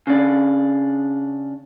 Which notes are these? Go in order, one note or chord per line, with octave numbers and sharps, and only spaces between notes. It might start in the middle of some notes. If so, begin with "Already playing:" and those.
C#3 D4